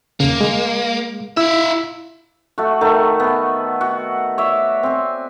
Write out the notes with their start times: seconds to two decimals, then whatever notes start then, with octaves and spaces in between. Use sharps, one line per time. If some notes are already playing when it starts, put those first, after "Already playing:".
0.20 D#2 C#3 A#3
0.41 G#3
1.37 E4 F4 E5 E6
2.58 A3 F#4
2.81 D#3 A3
3.20 B3
3.81 F#4
4.38 C#5 D5 E5
4.83 C4 G#5